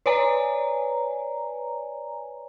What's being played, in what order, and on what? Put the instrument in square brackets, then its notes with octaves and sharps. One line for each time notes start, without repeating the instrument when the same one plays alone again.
[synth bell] B4 C#5 D5 G#5 A#5